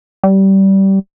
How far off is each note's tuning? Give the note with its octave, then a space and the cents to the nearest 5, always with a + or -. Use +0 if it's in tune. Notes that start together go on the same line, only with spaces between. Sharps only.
G3 -20